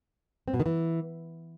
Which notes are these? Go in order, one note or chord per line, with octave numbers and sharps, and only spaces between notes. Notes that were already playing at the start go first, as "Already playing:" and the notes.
C4
B2
D#3
E3